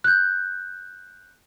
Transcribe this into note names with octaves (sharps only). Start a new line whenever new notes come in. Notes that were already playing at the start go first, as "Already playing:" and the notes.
F#6 G6